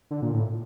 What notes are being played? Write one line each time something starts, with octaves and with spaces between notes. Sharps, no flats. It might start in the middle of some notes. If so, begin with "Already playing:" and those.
D3
A#2
A2